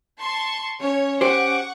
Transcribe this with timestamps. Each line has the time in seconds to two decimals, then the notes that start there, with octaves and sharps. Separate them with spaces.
0.20 A5 C6 C#6
0.80 C#4 C#5
1.21 G4 C5 F#5 C#6 D6